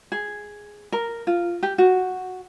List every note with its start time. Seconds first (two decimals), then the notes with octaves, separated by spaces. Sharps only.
0.12 G#4
0.92 A#4
1.27 F4
1.63 G4
1.78 F#4